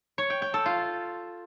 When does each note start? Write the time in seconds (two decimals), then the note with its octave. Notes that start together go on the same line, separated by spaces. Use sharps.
0.18 C#5
0.30 G5
0.42 G5
0.54 A4
0.66 F4